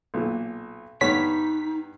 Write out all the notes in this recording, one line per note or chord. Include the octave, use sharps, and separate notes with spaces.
B1 A#2
G2 B3 D#4 C#5 B6